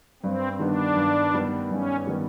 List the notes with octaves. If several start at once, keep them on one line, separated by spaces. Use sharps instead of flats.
G2 C4
D#3 G3 B3 D4
G2
D#3 G3 B3
G2 C#4
D#3 G3 B3